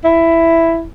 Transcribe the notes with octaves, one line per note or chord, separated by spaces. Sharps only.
E4